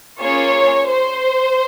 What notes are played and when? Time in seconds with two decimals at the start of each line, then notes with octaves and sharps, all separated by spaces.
0.20 A#3 C#4 F4 G#4 C#5
0.90 C5